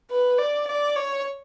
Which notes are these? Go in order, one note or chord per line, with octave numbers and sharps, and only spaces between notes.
B4
D5
D5
C#5